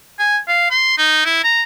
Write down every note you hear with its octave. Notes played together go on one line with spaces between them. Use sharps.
G#5
F5
C6
D#4
E4
A#5